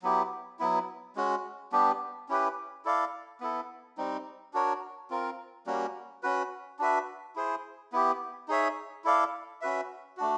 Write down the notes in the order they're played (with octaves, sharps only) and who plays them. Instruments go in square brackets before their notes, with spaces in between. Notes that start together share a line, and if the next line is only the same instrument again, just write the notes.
[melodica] F#3 B3 E4 G4
F#3 B3 E4
G#3 C#4 F#4
G3 B3 D4 G4
C#4 E4 G4 B4
E4 A4 D5 F5
B3 E4 A4
G3 C4 D#4
D4 F#4 A#4 C#5
C4 F4 A#4
G3 A#3 C#4 F#4
C#4 F#4 B4
D4 F#4 B4 E5
E4 G#4 C5
B3 E4 G4
D#4 G#4 C#5 E5
E4 A4 D5 F5
C#4 F#4 B4 E5
A3 D4 F#4